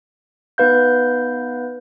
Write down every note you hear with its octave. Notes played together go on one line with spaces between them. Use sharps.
B3 D#4 B4 F5 G6